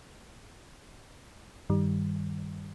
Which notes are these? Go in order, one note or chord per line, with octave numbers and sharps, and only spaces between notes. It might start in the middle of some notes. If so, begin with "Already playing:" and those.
G2 D#3 G3